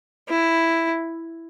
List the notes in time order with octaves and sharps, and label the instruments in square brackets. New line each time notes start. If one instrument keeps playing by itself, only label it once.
[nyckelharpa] E4